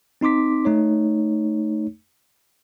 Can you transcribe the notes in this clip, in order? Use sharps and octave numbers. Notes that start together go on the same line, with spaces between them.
C4 D#4 C6 D6 B6
A3 D#4 C#5